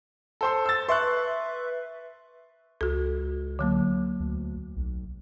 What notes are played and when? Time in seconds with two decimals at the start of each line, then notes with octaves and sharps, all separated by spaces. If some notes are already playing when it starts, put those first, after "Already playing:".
0.41 A4 C5 C6
0.66 E6 A6
0.89 B4 E5 C6 C#6 F#6
2.81 C#2 F#4 A4
3.59 D3 F#3 A#3
4.20 D2
4.76 B1